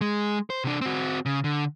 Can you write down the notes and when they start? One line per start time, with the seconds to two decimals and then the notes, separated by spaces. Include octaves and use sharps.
0.01 G#3
0.50 C5
0.64 C3 D4
0.81 C4 F#4
1.26 C#3
1.44 D3